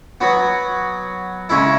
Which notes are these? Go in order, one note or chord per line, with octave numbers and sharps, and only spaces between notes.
F#3 B3 F#4
C#3 G#3 C#4 E4